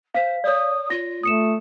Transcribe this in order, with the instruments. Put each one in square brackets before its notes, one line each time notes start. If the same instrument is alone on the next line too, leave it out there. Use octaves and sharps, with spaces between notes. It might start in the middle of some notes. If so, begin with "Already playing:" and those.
[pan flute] C5 [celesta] F5 B6
[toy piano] C#5 D5 [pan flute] D#6
[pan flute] F4 [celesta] A#6
[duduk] A3 [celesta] D#6 C#7 E7